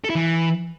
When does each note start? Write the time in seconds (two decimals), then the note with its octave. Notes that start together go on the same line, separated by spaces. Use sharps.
0.04 A4
0.10 E4
0.15 E3